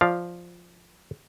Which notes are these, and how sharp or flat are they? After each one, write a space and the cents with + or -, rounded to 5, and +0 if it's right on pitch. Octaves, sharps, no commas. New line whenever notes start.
F3 +0 D5 +0 F5 +0